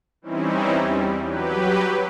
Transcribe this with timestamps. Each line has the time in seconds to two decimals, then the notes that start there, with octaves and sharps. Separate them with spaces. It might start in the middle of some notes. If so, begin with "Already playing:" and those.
0.22 E3 G3 C4 C#4 D#4 E4
0.79 E2 G3
1.21 F#3 G4 B4